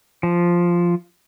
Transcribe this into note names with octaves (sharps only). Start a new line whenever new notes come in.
F3